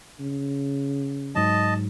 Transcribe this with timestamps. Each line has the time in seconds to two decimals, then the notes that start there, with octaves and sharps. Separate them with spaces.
0.20 C#3
1.35 G#2 F#3 D#5 A5